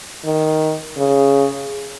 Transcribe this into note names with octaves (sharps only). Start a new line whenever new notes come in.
D#3
C#3